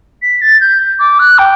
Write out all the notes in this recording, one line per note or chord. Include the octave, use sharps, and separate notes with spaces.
B6
A6
G6
D6
F#6
G5